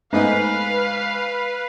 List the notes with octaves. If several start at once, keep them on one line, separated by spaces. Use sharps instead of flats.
G#2 A3 B3 D#4 B4 F5